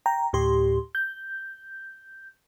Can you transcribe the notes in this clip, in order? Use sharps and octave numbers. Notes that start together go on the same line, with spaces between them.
G5 A#5
D2 A2 G4 C6
G6